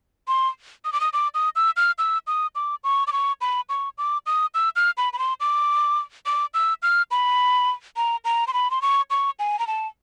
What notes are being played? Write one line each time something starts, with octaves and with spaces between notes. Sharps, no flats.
C6
D#6
D6
D#6
D6
D#6
E6
F6
E6
D#6
D6
C#6
D6
C#6
B5
C#6
D6
D#6
E6
F6
B5
B5
C6
D6
D6
E6
F6
B5
A#5
A#5
C6
B5
C6
C#6
C#6
G#5
A#5
A5